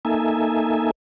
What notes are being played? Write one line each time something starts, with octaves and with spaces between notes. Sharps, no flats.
A#3 D#4 A4 E5 G#5